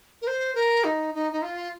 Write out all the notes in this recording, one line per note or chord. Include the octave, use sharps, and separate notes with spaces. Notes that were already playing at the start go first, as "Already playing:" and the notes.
A#4
C5
A#4
D#4
D#4
D#4
F4